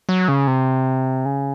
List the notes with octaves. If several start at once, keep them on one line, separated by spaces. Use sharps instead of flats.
F#3
C#3
C3
C#3